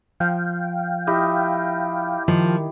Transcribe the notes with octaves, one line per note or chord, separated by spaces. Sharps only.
F3 F5 G5
E4 G4 D#5
D#3 F3